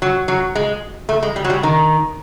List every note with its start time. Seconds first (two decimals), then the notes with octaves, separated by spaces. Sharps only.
0.02 F#3
0.28 F#3
0.55 G#3
1.09 A3
1.23 G#3
1.36 G3
1.44 F#3
1.50 G3
1.63 D#3